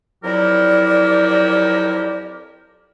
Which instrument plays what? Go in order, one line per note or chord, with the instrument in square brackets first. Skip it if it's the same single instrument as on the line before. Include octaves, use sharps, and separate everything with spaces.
[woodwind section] F2 F#3 E4 G4 A#4 D5